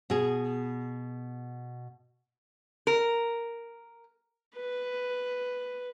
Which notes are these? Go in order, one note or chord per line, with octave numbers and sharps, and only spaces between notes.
B2 G#4
A#4
B4